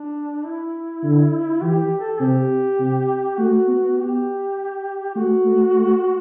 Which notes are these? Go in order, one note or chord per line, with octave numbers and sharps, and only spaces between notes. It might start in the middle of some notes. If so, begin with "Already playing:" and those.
Already playing: D4
E4
D3
E3 G4
G4
A4
C3 G4
C3
A3 F#4
B3
G4
A3 F#4
A3
A3